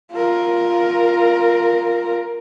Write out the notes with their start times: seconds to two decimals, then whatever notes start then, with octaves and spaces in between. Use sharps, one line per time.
0.12 F4 A#4